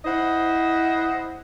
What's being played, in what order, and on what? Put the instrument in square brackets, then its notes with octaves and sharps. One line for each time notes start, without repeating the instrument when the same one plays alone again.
[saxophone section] E4 C5 D#5 F#5